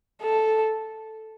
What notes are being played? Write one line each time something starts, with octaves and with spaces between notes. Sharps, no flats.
A4